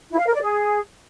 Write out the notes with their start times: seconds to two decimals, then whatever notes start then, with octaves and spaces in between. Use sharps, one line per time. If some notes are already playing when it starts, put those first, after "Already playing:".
0.11 E4
0.19 F5
0.27 A#4
0.34 D5
0.42 G#4